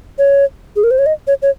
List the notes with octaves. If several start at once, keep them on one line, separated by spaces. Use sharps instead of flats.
C#5
G#4
A#4
C5
C#5
D#5
C#5
C#5